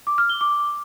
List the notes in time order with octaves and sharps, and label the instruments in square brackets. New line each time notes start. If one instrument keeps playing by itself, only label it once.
[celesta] D6
F6
G7
D6